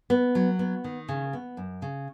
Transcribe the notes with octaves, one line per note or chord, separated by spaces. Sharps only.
B3
F#3
B3
D#3
C#3
B3
F#2
C#3